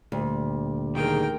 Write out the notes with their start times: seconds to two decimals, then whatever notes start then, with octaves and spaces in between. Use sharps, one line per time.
0.12 D2 A#2 D3 G3
0.95 B2 D#3 G#4 A#4 G5